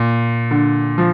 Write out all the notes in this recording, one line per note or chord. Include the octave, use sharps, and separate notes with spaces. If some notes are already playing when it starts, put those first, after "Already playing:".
Already playing: A#2
D3
F3